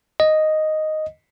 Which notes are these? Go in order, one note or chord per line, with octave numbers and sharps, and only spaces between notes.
D#5